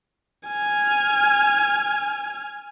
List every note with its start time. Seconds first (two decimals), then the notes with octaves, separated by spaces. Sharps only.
0.48 G#5 F6